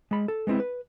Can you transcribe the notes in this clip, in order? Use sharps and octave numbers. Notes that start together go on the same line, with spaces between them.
G#3 B5
A4
G#3 B3 C4 E4
B4